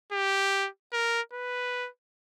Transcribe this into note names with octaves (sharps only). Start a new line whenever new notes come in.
G4
A#4
B4